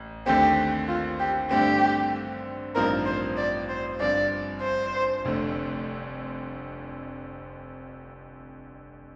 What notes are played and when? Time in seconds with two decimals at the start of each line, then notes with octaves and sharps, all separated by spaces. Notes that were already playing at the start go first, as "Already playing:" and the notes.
Already playing: A1
0.26 D#2 D3 A3 C4 G4
0.88 F4
1.20 G4
1.51 G2 D3 A3 C4 G4
2.75 A1 G2 F3 C4 D#4 A#4
3.06 C5
3.37 D5
3.69 C5
3.99 G1 G2 F3 C4 D5
4.61 C5
5.25 F1 F2 D3 A3 C4